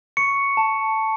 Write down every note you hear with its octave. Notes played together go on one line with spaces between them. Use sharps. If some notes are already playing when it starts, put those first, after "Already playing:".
C#6 C#7
A5